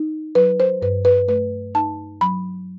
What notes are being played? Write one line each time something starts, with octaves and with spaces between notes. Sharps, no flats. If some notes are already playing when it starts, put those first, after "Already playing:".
Already playing: D#4
F#3 B4
C5
G2 B4
B4
A3 B4
D#4 A5
F#3 B5